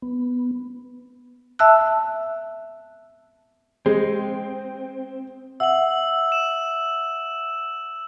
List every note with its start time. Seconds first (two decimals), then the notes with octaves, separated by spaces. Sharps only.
0.02 B3
1.59 E5 A5 E6 F#6
3.86 G#3 C4
5.60 E5 F#5 E6 F#7
6.32 E7